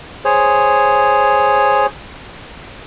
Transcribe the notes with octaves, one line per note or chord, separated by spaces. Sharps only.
G#4 C5 C#5